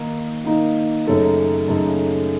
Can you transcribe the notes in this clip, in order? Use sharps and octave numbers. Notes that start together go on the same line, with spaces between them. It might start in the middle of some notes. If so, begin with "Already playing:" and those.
Already playing: D#3 A#3 D#4
D#3 A#3 D#4
F#2 C#3 A3 D#4 A4
F#2 C#3 A3 D#4 A4